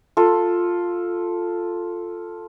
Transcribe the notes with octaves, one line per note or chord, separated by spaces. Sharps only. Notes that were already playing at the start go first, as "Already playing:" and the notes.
F4 A4